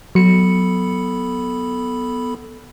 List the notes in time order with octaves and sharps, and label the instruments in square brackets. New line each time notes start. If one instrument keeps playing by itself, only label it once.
[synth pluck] F#3 C#7 [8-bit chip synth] B3 A4 B5